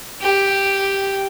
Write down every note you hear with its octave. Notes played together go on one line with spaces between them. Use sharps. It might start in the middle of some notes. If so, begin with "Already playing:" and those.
G4